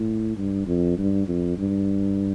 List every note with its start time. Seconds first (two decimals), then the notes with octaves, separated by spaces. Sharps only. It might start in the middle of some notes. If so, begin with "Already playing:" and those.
Already playing: A2
0.37 G2
0.67 F2
0.98 G2
1.28 F2
1.59 G2